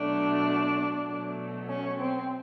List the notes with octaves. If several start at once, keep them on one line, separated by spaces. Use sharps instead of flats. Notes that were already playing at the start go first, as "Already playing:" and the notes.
Already playing: B2 F#3 A3 D4
B2 F#3 A3
C#4
C4